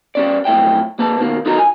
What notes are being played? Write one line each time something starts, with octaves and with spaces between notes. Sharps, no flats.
G3 C#4 D5
B1 F2 A2 E5 G5
A#3 B4 A5
B2 D#3 A#3
D#4 F#4 A4 A#4 D#5 A#5
G#5